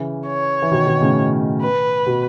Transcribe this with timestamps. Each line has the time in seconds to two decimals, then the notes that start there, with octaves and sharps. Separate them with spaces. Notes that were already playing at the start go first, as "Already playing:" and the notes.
Already playing: C#3 E3
0.27 C#5
0.62 E3
0.71 B2 D#3
0.87 B2 D#3
1.01 A2 C#3
1.61 B4
2.06 B2